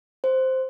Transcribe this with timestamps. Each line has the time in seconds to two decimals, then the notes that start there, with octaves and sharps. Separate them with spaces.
0.24 C5